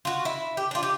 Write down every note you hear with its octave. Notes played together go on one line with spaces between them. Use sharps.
F4 F#4
E4
G4
D4 F4
G4